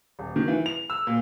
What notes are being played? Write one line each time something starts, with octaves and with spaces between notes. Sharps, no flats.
D#1
D#3
E3
F7
E6
A#2